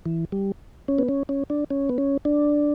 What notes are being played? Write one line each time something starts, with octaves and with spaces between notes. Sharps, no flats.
E3
G3
C#4
B3
C#4
C#4
D4
C#4
B3
C#4
D4